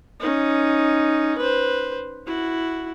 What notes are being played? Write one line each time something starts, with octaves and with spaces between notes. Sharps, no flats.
C#4 D#4
B4 C5
E4 F#4